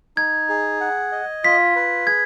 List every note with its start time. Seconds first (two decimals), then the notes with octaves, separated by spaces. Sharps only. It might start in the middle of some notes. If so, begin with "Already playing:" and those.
0.17 D#4 G#6
0.49 G#4
0.81 F#5
1.12 D#5
1.44 F4 B6
1.76 B4
2.06 G#4 G#6